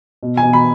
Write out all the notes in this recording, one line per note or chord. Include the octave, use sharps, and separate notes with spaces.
B2
G#5
B2
B5